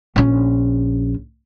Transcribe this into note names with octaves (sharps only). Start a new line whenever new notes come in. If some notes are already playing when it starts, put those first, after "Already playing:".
A#1 C#4